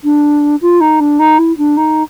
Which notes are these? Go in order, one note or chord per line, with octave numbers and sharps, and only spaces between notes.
D4
F4
D#4
D4
D#4
E4
D4
D#4